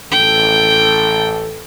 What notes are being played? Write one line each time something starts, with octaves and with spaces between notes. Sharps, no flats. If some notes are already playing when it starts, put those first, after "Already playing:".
A1 A4 G5